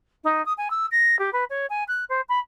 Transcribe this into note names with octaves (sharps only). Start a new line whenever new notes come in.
D#4
D#6
G#5
E6
A#6
G4
B4
C#5
G#5
F#6
C5
B5